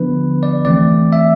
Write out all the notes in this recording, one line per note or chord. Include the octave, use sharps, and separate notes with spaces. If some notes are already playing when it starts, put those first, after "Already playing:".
Already playing: D3 F3 B3 D4 B4
D5
E3 A3 C4 D5
E5